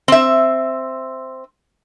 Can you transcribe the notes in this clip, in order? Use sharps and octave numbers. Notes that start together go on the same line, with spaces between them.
C4 E5